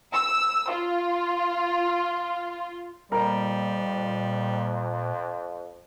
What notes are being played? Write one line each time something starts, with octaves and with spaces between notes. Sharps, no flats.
E6
F4
F2 A#2 G3 A#4 A#5